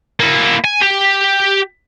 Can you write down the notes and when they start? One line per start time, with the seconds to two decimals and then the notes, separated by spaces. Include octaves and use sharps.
0.20 A#3 E4
0.64 G#5
0.82 G4